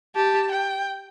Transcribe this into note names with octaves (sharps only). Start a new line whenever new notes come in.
G4 A5
G5